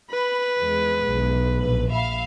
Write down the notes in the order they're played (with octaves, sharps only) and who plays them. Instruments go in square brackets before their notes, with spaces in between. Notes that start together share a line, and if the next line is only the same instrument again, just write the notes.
[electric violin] B4 [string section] B5
[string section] E2 F3 G#3
[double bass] B1
[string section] A#1 B4
[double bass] A#1 [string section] E5 F5 B5